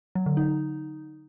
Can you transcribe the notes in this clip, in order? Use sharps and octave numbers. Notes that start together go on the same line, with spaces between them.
F#3
D3
D#4